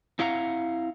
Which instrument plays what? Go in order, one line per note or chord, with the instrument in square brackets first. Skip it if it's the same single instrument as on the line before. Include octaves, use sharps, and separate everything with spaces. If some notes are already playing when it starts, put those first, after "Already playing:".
[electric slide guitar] C4 E4 F5 F#5 A#5